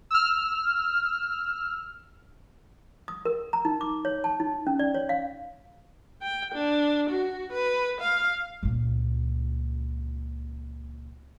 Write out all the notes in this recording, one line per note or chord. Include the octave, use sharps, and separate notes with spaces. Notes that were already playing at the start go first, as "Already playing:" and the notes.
E6 F6
D#6
A#4
A#5
D#4
D6
C#5
A5
D#4
C#4
D5
C#5
F5
G5
D4
F#4
B4
F5
C#2 A#2